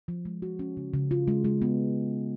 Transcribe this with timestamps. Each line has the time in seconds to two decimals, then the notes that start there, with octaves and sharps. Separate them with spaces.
0.08 F3
0.25 G#3
0.42 F#4
0.59 C#4
0.77 C#3
0.94 C#3
1.11 F4
1.28 G#3
1.45 G#3
1.62 B3